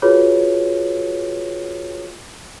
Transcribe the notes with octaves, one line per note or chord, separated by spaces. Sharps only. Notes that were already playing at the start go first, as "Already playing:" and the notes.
F4 F#4 G#4 B4 C#5